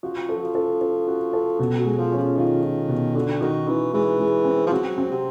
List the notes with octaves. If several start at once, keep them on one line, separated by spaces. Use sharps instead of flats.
F3 F#4
A4
F#3
F3
A4
A4
F#4
A4
B2 F#3
F#3
G#3
F3
C#4
F3
D#3 F4
F4
B2
D3 F#4
D#3 F#4
E3 D#4
E3 G#3
G#3
C4
F3
F#3 C4
C4
C3